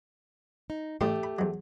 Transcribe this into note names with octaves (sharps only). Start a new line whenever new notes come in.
D#4
A1 A2 A3 G4 C6
B5
E2 F#3